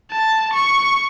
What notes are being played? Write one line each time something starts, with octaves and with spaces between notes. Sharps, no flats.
A5
C#6